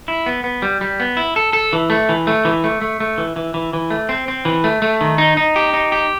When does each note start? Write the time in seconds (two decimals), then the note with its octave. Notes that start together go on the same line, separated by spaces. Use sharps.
0.08 E4
0.26 B3
0.44 B3
0.62 G3
0.81 G3
1.00 B3
1.17 E4
1.36 A4
1.53 A4
1.73 E3
1.90 A3
2.09 E3
2.27 A3
2.45 E3
2.64 A3
2.82 A3
3.00 A3
3.18 E3
3.36 E3
3.54 E3
3.73 E3
3.90 A3
4.09 C4
4.28 C4
4.45 E3
4.64 A3
4.82 A3
5.01 D#3
5.18 D#4
5.37 D#4
5.56 G4
5.74 D#4
5.92 G4